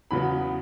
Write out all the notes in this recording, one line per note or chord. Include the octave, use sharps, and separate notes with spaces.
E2 C#3 F#3 B3 B5